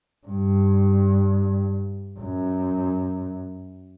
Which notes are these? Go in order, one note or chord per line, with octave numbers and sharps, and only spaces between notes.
G2
F#2